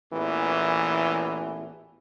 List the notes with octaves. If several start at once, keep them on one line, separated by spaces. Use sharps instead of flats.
A1 E2 A#2 E3